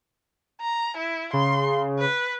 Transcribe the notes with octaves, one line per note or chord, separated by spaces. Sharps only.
A#5
E4
C#3 C6
B4